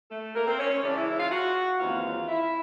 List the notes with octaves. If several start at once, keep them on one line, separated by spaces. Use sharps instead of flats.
A3 A4
A#3 A#4
C4 C5
C#4 C#5
C#4 C#5
C#3 E3 G#3 D4 D5
E4 E5
E4 E5
F4 F5
F#4 F#5
D#2 C#3 E3 G#3 C4 F4 F5
E4 E5